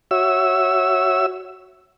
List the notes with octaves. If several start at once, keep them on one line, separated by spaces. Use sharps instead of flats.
F#4 C#5 E5 E6